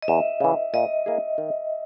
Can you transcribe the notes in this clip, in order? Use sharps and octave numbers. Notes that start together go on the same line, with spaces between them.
D#5
E2 E5
C#3 E3
A#2 D#5
A#3 E4 G#4
D#3